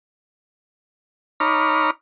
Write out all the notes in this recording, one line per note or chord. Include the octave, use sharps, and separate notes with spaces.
D#4 C#5 A#5 B5 D6 F6